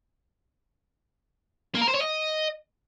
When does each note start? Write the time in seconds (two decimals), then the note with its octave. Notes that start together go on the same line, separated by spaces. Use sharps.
1.75 A#3
1.82 A#4
1.88 C5
1.95 C#5
2.01 D#5